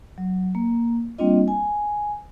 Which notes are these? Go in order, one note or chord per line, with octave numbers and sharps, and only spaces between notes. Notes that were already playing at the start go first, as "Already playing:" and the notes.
F#3
A#3
G3 A#3 C4 D4 F4 D#5
G#5